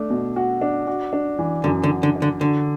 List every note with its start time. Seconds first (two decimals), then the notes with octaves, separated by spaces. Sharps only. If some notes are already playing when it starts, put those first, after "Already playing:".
Already playing: A3 D4
0.10 B2
0.36 F#4
0.62 D4
0.87 F#4
1.13 D4
1.39 E3
1.64 F#2 D3
1.84 D3
1.90 F#4
2.03 D3
2.16 D4
2.22 D3
2.40 D3 F#4